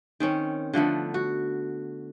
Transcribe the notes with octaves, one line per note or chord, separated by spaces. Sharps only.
D#3 C4 C#4
D3 F3 A3 B3
F#4